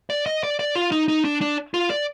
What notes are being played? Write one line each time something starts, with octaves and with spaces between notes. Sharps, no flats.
D5
D#5
D5
D5
F4
D#4
D#4
D4
D4
F4
D5